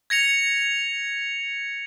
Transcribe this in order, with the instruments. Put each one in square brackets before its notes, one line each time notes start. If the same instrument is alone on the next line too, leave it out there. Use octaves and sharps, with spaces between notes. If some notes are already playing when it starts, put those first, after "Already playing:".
[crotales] G#6 A#6 C#7 F7